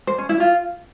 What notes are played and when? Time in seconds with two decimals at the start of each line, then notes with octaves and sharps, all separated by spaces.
0.07 C5
0.18 C#4
0.29 E4
0.40 F4